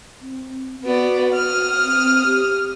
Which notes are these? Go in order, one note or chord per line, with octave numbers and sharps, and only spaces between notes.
C4
B3 F#4 D5
D#6 F6
C4
G4